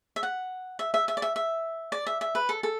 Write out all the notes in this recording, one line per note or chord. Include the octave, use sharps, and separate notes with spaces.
E5
F#5
E5
E5
E5
D5
E5
E5
D5
E5
E5
B4
A4
A4